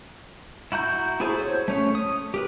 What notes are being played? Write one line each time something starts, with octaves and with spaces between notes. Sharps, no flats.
E4 F#4 A#5 G6
E4 F#4 G#4 A4 C5
C5 C#5
A3 C#4 C#5
D#6
G4 A#4 B4